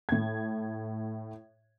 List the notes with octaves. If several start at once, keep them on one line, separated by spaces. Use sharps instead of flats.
A2 G#6